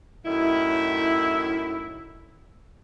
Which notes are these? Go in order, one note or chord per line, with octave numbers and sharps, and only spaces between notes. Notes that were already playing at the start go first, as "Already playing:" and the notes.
F#2 A2 D#3 E4